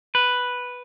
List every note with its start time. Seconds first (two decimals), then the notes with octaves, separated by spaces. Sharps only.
0.15 B4